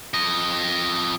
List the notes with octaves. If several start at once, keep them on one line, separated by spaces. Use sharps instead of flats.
F2 D#5